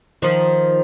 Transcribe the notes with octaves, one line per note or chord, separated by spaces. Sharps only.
D#3 F3